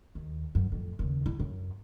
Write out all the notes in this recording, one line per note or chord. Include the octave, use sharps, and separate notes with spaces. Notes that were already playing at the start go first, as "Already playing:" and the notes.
D#2
F#2
F2 A2
D#2 C#3
E4
F#2